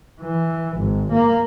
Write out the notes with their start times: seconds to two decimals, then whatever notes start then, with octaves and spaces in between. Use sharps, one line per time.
0.21 E3
0.77 G#1
1.12 A#3